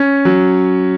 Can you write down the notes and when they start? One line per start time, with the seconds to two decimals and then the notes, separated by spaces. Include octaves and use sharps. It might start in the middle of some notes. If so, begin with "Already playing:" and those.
Already playing: C#4
0.25 F#3